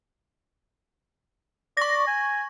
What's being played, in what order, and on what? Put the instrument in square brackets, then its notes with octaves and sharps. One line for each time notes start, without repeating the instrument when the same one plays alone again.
[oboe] D5 [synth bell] C#6 A#6
[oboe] G#5